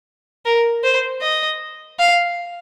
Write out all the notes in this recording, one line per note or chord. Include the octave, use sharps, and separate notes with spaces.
A#4
C5
D#5
F5